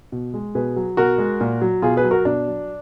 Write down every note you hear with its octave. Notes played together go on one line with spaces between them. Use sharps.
B2
G#3
B2 G#4 B4
F#3
B2 F#4 A#4
G#3
A#2
F#3
B2 F4 G#4
G#4 B4
F#3
F#4 A#4
B2 D4
F#3